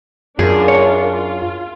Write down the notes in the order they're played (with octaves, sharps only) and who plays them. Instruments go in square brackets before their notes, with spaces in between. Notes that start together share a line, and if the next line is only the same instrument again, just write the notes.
[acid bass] F#2 [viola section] D4 F4 A#4 [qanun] G#4
[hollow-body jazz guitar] C#5
[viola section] F4